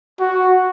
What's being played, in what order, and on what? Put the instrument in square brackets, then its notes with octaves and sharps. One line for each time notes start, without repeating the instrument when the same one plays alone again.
[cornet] F#4